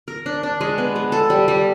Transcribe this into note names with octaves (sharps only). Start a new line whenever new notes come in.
A#4
D4
D4
G#3
B3
G#3
A4
G3
G3